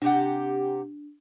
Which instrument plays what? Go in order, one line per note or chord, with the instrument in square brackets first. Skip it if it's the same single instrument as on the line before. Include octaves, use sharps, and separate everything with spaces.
[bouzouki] C3 G4 F#5 [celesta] D4